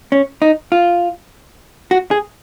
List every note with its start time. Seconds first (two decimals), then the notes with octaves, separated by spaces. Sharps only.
0.12 C#4
0.42 D#4
0.72 F4
1.91 F#4
2.11 G#4